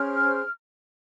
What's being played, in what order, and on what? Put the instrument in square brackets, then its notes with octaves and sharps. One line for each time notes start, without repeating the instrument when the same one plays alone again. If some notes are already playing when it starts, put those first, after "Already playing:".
Already playing: [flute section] C#4 G#4 C5 F6